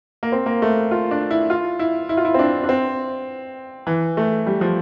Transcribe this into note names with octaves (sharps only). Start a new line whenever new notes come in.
A#3
C4
A#3
A3
F4
D4
E4
F4
E4
E4
F4
E4
C4
D4
D4
C4
E3
A3
G3
F3